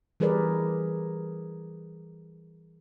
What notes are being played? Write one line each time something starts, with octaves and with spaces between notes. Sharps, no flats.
E3 G3 G#4 A#4 B4 D5